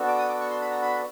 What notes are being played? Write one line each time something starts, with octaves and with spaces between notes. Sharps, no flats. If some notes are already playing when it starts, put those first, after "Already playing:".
Already playing: B3 D4 F#4 A4
D6
D#6
D6
C#6
C6
B5
A#5
B5